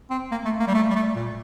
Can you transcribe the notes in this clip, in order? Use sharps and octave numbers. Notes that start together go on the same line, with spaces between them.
C4
A#3
A3
A#3
G3
A3
G3
A3
A#2